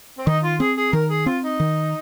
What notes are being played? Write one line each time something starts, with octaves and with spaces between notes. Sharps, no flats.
C4
D#3 D#4
F4
C4 G#4
G#4
D#3 A#4
G#4
C4 F4
D#4
D#3